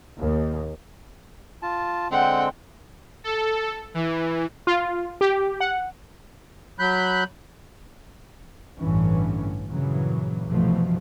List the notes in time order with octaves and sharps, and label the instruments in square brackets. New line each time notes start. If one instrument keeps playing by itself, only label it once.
[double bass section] D#2
[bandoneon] F4 A5
[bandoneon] D3 G#3 C4 [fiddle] F#5 G5
[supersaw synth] A4
E3
[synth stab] F4
G4
F#5
[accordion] F#3 B5 F#6 G6
[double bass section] A1 G2 D3 E3 C#4
G2 A#2 C#3 E3 F#3
C2 G2 B2 E3 F3 A3